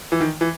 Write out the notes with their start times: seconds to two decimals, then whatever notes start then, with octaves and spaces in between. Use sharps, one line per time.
0.12 E3
0.20 D#3
0.41 E3